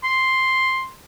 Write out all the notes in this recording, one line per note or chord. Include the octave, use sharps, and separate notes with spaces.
C6